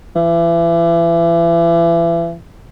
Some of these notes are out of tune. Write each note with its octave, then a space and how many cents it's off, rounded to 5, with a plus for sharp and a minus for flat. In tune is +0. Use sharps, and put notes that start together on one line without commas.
E3 +35